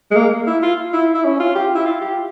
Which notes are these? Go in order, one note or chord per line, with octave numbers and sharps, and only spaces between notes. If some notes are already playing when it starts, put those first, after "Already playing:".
G#3
A#3
E4
F4
E4
E4
C#4
F4
G4
E4
F4
G4